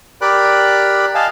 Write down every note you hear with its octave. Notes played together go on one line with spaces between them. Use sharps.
G4 A#4 D5 G5 B5 F#6
D#5 F5 G#5 A5